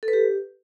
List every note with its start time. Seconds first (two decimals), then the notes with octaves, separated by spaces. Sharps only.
0.03 A4
0.08 B4
0.13 G4